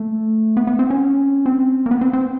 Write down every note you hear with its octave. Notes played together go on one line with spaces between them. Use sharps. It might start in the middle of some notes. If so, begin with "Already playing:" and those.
Already playing: A3
B3
B3
C4
C#4
C4
A#3
B3
C4
C4